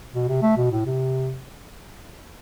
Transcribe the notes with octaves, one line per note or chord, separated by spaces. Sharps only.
B2
C3
A3
B2
A2
C3